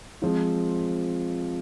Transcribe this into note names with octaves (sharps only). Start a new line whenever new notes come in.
F3 G#3 C4 F4